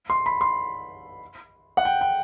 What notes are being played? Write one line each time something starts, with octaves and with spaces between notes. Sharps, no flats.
C6
B5
C6
F#5
G5
G5